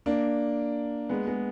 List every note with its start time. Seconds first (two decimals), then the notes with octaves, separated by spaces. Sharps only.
0.06 A#3 D4
1.09 G#3 B3
1.27 G#3 B3